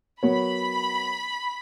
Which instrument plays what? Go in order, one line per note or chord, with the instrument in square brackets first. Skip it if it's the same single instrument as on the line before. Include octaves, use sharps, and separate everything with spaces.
[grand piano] F#3 B3 F#4 A#4 C#5 [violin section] B5